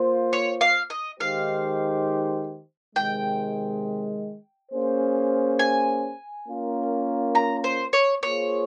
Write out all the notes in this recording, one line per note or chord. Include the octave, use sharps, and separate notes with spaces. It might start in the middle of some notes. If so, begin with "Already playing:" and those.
Already playing: A#3 F4 C5
C#5
F5
D#5
D#3 G#3 D#4 G4 C5 F5
C3 D#3 G#3 G5
A#3 C#4 G#4 C5
G#5
A#3 C#4 F4 A#4
A#5
C5
C#5
A#3 F4 G#4 C5 C#5